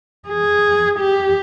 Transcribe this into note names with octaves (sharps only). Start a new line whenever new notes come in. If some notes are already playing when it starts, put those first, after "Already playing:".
G#4
G4